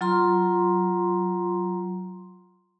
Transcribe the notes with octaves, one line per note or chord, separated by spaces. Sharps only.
F#3 F4 A#5 C6